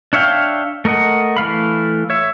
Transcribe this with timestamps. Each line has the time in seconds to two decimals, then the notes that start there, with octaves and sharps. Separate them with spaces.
0.13 D4 C#5 E5 F5 G5
0.85 A3 A#4 D#5 F#5
1.37 E3 A3 F5 B5
2.10 C#5 E5